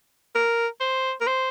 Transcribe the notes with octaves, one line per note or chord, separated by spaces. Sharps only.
A#4
C5
A#4
C5